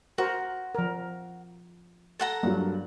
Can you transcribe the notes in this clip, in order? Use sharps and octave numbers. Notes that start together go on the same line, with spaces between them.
F#4 A#4 C5
F3 A#4
A4 F#5 A#5
G2 F#3 A#3